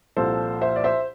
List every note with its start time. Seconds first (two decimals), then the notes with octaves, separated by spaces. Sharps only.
0.17 C2 A#2 F3 A4 C5
0.61 C5 E5
0.76 D5
0.84 C5 E5